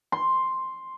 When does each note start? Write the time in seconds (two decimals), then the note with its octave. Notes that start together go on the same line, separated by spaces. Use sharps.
0.12 C6